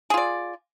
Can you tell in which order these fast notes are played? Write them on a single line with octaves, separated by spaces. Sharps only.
G#4 F4 D5